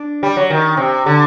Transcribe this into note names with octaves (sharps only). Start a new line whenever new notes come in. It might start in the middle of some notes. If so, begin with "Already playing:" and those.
Already playing: D4
G3
F#3
D#3
C3
D3